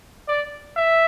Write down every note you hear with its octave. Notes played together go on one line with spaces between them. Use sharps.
D5
E5